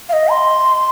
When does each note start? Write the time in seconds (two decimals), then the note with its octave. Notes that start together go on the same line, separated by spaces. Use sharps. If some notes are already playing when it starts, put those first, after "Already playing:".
0.09 F5
0.13 D#5
0.31 C6